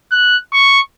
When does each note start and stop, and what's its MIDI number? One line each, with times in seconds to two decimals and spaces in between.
0.11 0.37 90
0.53 0.79 85